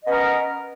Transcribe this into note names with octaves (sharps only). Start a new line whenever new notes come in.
B3 C#4 A#4 D#5